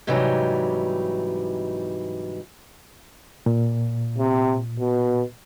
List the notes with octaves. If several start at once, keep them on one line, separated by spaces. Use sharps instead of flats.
G#2 C3 E3 F#3 G3 D#4
A#2
C3
B2